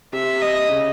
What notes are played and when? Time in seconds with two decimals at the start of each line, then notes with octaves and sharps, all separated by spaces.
0.13 C3 E5
0.42 D#5
0.70 C#3